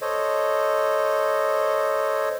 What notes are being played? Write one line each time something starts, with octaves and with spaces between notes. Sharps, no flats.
A4 C5 C#5 D#5